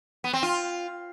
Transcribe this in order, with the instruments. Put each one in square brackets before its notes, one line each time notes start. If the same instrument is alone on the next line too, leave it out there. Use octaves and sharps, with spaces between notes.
[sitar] B3
C4
F4